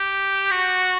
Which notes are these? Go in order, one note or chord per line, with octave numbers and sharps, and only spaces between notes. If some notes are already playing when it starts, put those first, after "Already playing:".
Already playing: G4
F#4